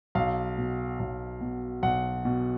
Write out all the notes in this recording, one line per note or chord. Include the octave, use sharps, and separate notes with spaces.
B1 F5
B2
B1
B2
B1 F#5
B2